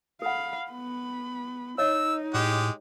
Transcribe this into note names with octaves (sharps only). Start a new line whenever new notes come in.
A4 F5 F#5 B5
B3 B5
D#4 C#5 D#5 E6
A2 G#3 G4